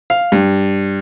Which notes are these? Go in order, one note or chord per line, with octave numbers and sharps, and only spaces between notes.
F5
G2